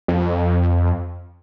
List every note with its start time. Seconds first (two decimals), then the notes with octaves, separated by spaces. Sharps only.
0.08 F2